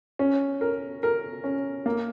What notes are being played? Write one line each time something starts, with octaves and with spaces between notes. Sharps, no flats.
C#4
A#4
A#4
C#4
A#3